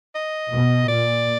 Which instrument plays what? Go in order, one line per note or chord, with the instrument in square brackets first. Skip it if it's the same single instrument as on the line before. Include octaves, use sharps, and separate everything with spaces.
[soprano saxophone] D#5
[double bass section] B2
[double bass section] A#2 [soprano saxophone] D5